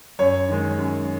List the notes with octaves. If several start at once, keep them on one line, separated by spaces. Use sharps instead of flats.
F#2 C#5
D#3 G#3
F#2